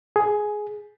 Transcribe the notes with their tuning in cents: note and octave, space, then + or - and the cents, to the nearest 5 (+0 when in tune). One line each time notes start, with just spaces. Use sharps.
G#4 +10